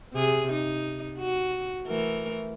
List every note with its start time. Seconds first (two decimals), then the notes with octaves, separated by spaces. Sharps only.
0.13 C3 G#4
0.52 D#4
1.19 F#4
1.87 E3 A3 A#4